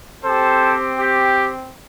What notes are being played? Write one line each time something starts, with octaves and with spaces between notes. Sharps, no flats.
C4 G4 A4 C5
G4